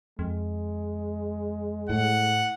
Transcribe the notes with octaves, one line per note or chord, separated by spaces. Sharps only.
F2 G#3
A2 F#5